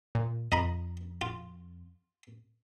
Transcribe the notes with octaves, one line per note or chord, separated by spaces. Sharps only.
A#2
F2 D#5 A#5 B5
F4